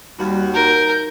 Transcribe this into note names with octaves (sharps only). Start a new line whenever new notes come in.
D#2 G3 F#4
D#4 A#4 G6